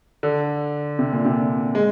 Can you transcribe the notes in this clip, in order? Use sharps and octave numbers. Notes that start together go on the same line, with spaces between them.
D3
C3
A#2
C3
G#3